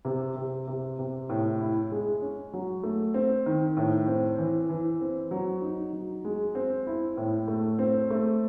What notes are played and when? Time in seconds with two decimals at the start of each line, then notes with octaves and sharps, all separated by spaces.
0.05 C3
0.36 C3
0.67 C3
0.99 C3
1.29 A2
1.61 E4
1.92 G#3
2.22 C#4
2.53 F#3
2.83 A3
3.14 C4
3.46 D#3
3.77 A2
4.08 C4
4.39 E3
4.69 E3
5.01 C4
5.31 F#3
5.62 D#4
5.93 F#3
6.25 G#3
6.55 C4
6.87 E4
7.17 A2
7.48 A3
7.79 C4
8.10 A3